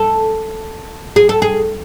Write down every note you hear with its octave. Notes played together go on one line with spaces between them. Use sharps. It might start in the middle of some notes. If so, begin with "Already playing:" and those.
Already playing: A4
G#4
A4
G#4